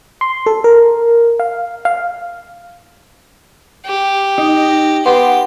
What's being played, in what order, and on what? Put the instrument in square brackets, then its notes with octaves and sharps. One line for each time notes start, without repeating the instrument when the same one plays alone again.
[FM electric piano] C6
A4
A#4
F5
F5
[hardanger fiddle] G4
[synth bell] D#4
[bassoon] B3 [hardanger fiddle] G4 [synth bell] C6